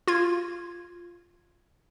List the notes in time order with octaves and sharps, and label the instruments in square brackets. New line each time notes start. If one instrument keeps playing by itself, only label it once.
[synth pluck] F4 G#6